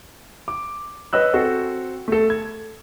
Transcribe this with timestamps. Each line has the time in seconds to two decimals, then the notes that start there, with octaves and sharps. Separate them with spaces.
0.48 D6
1.13 B4 C#5 D#5 E6 F#6
1.34 C4 F#4 A4 C5
2.08 A3 A4
2.30 G#6